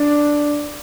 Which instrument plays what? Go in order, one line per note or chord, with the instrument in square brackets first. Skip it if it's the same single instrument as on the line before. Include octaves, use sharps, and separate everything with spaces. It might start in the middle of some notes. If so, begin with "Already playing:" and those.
Already playing: [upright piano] D4